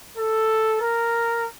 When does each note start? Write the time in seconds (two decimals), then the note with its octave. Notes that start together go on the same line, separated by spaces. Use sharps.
0.17 A4
0.81 A#4